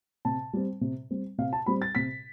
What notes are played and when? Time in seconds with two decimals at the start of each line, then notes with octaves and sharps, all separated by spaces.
0.25 C3 A5
0.53 G3 C4
0.81 C3
1.11 G3 C4
1.38 C3 F5
1.53 A5
1.66 G3 C4 B5
1.82 A6
1.95 C3 B6